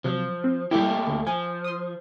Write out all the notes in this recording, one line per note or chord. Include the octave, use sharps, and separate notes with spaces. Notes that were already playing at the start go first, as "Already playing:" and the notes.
C3 F3 F#3
C4
G3 A3 A#3 E4 G4
D2
F3 G#5
C6 D#6